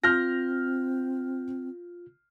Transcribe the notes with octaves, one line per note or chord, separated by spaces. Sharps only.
C4 F4 F6 G6 A#6